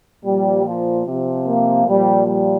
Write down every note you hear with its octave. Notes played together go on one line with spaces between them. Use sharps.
A#2 F3 G3
F3
C3 F3
A#3
A#2 F3 G3
G3